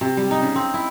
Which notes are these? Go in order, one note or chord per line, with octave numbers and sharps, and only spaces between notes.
C3
G3
D#4
C#3
C4
E4